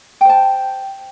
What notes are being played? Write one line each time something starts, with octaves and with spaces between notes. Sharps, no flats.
C5 G5 A5